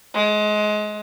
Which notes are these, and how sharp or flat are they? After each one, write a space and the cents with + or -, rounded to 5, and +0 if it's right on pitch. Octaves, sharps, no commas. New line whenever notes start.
G#3 +25